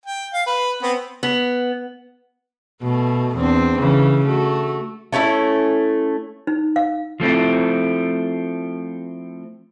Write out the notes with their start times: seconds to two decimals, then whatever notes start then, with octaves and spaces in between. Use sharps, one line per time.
0.06 G5
0.33 F5
0.46 B4
0.82 B3 C4
1.23 B3
2.82 B2 A3
3.36 E2 C4 D4
3.80 C#3 E3
4.25 A3 F#4
5.12 A3 C#4 D#4 E4
6.47 D#4
6.76 F5
7.20 F3 A3 C4 E4